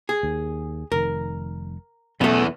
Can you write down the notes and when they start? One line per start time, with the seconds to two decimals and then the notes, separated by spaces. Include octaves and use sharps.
0.09 G#4
0.23 D#2
0.92 F1 D#3 A#4
2.21 E2 B2 E3 F#3 A3 C#4